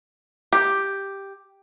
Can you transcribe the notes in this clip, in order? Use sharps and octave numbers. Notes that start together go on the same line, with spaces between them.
G4